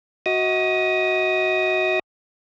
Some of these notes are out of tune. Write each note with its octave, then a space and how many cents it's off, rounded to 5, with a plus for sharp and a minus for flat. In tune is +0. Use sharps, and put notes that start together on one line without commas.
F#4 +0 D#5 +35 D#6 +0